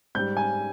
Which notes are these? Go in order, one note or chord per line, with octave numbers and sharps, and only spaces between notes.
G#2 G3 G6
G#5